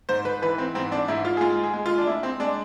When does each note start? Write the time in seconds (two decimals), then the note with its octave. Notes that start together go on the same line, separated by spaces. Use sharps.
0.09 G#2 C5
0.25 B4
0.42 E3 B4
0.58 C4
0.75 G#2 C4
0.92 D4
1.08 G#2 E4
1.25 F4
1.37 G#4
1.41 G#3 F4
1.63 G#4
1.73 G#3
1.86 F4
1.98 D4
2.07 G#3 E4
2.23 C4
2.40 G#3 D4